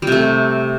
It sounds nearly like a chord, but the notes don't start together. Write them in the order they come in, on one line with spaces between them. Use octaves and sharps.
G3 C3 A3